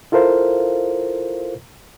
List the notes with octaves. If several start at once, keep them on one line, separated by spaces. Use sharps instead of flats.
E4 F4 A4 A#4 C5 F5